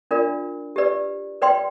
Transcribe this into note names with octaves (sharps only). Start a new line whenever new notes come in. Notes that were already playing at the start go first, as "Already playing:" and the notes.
D4 F4 A#4 D5
G4 B4 D5
B4 D5 G5 C6